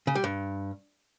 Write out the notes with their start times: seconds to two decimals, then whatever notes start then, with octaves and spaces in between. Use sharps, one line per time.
0.07 C#3
0.15 G3
0.24 G2